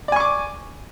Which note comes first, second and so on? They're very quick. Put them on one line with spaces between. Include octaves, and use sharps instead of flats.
D5 G#5 C#6 D6